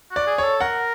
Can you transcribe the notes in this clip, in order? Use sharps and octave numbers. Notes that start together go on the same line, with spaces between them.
F#4
D5
G#4
C#5
A4
A#4 F#5